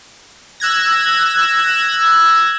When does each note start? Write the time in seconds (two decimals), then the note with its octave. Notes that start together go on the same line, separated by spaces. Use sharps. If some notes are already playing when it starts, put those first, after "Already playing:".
0.60 E6 F#6 G#6 A#6